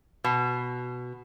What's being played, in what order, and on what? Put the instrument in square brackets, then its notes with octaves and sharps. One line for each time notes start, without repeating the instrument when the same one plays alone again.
[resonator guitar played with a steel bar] B2